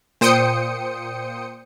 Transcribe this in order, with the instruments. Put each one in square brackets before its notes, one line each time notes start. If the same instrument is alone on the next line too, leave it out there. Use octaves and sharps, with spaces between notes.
[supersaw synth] A#2 C5 G5 D#6 C#7